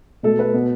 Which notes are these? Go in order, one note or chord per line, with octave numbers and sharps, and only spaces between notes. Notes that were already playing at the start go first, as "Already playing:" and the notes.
B2 A3 A4
B4
B2 B3